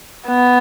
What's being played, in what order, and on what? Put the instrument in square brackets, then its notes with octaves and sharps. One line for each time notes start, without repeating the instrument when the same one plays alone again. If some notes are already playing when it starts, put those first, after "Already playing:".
[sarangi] B3